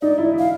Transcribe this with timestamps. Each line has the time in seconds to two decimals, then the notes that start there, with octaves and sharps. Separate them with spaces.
0.02 D#4 D5
0.18 E4
0.34 E4
0.39 F5